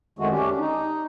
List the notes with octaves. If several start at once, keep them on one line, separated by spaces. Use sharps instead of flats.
F2 D#3 G#3 A3 F#4
C#4 D4 G4
D#4